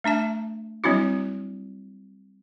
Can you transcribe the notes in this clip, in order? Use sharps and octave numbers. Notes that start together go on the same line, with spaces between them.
A3 D4 E5 A5
F#3 G3 C4 D4 E4 F#4